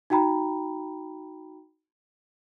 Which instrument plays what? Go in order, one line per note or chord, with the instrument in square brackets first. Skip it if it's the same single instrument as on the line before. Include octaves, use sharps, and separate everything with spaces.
[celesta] D#4 F#4 G5 A#5 B5